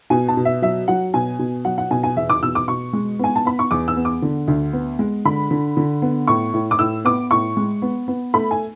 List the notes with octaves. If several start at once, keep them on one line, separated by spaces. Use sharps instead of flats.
B2 G#5
A5
B2
E5
F#3 E5
F#3 F#5
B2 G#5
B2
F#3 F#5
F#5
B2 G#5
G#5
E2 E5
D6
B2 E6
D6
B2 C#6
G#3
B3 G#5
A5
B3 B5
C#6
E2 D6
E6
B3
D6
D3
D2
B3
G#3
D3 B5
D3
D3
B3
A2 C#6
A2
D6
A2 E6
B3 D6
A2 C#6
G#3
B3
B3
A3 B5
G#5